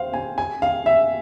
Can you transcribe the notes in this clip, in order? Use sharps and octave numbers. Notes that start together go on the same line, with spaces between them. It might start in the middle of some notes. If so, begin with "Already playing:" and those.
Already playing: C5 F5
G#5
G#5
F5
E5